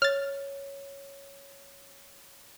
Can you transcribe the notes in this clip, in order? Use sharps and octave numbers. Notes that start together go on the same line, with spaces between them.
C#5 F6 A6